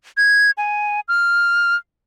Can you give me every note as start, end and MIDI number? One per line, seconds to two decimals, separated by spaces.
0.17 0.51 92
0.58 1.00 80
1.08 1.75 89